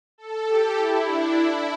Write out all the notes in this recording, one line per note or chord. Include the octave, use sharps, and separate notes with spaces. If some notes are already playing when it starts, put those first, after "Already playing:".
A4
G4
E4
D4
E4